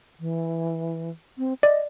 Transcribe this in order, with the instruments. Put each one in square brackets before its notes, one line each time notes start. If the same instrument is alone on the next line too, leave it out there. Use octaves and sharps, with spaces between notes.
[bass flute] E3
C4
[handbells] D5 [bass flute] D#5